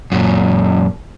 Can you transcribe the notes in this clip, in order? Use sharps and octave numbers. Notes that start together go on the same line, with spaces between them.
F#2 A#2